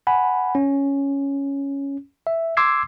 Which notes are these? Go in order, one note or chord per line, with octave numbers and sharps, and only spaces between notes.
F#5 G#5 B5
C#4
E5
C6 D6 E6 G#6 C7